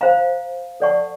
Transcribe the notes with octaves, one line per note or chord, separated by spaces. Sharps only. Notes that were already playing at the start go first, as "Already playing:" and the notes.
C5 F5 A#5
A4 D5 F#5 A5 C#6